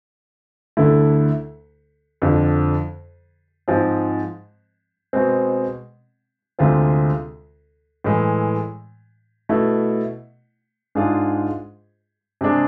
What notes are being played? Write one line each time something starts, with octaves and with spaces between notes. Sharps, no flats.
D2 D3 A3 E4
F2 D3 F3
G#2 F3 G#3 C4
B2 G#3 C4
D2 C3 G#3 C4 F4
A2 E3 G#3
B2 A3 E4
G#2 G#3 D4 F4 G#4
C3 G#3 D4 G#4